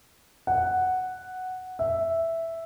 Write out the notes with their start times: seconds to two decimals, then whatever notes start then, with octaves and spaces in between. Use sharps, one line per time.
0.47 F#5
1.79 E5